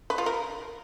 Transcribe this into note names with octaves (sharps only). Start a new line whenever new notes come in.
B4
F4
A#4